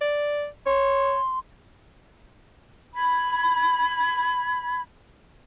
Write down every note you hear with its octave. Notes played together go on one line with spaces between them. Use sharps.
D5
C#5 C6
B5 G#6